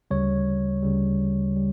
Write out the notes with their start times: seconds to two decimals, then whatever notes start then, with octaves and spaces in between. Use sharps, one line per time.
0.11 D2 C#3 G3 C#5
0.83 D2 C#3 G3
1.56 G3